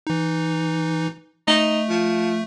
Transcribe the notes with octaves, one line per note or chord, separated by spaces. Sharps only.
E3 D#4
A3 D#4
F3